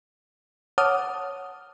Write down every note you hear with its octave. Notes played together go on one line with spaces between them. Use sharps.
C#5 F#5 A5 D6 D#6 F6